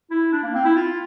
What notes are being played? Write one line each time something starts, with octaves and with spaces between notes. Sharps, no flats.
E4
D4
A#3
C4
E4
F4